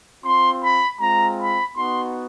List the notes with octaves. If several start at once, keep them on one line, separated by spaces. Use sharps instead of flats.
C4 F4 C6
B5
G#3 C4 F4 A#5
B5
B3 D#4 F#4 C6